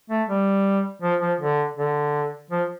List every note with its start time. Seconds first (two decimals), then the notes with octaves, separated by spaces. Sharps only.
0.10 A3
0.28 G3
1.02 F3
1.21 F3
1.40 D3
1.77 D3
2.50 F3